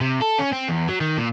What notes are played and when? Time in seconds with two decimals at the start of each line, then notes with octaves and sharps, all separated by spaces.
0.01 C3
0.21 A4
0.38 C#4
0.52 C4
0.68 E2
0.89 F#3
1.01 D#3
1.18 A#2